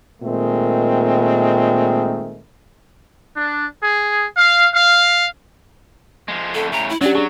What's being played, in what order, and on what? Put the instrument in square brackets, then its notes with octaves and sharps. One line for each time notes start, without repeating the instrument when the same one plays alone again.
[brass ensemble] A#2 D#3 G#3 A3 C4
[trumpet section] D4
G#4
F5
F5
[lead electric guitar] F3 G#3
[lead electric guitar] F2 A2 [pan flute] A4
[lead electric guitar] A2 C#3 [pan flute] A#5
[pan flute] E4
[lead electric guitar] F#3 [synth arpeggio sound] C#4 D4 G4 [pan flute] D5
[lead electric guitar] F#3 [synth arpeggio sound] D4 G#4